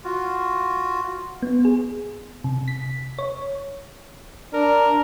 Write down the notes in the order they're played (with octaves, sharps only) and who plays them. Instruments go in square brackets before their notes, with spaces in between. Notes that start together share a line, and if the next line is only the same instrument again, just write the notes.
[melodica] F4 F#4
[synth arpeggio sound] B3
G#4
C3
B6
C#5
[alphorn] D4 [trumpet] A#4